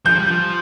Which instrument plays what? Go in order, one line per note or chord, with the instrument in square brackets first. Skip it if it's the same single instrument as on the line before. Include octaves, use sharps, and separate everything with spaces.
[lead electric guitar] F3 [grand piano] G6
[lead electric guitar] G3
F3